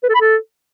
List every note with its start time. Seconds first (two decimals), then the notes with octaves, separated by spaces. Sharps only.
0.03 B4
0.09 A4
0.15 B5
0.21 A4